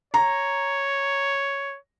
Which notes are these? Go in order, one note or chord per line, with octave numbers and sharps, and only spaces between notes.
C#5 A#5